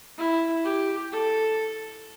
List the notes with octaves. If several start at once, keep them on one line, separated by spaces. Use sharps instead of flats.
E4
G4
A4